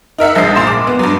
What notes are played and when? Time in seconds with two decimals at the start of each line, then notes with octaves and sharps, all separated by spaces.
0.18 D#4 A#4 E5 F#5
0.35 A#1 F3 G#3 D#6 C7
0.56 A#2 C6 E7
0.67 D6
0.87 B3
0.99 G2 F#3